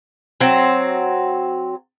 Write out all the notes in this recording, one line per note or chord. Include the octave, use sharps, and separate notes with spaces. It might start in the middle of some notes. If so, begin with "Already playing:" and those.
F#3 C4